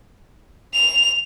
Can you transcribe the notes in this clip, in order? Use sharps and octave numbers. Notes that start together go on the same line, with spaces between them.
F7